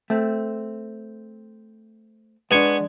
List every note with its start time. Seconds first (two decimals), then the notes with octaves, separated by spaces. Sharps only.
0.10 A3 C4
2.51 G#3 B3 D4 G#5 C#6